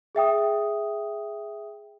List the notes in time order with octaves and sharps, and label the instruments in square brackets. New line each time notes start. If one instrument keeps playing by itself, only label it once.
[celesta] G#4 E5 G5 D#6